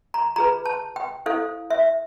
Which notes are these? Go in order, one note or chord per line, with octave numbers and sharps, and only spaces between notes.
A#5
F4 G#4 B4 A#5
A5
G5
E4 A4 C5 F5
E5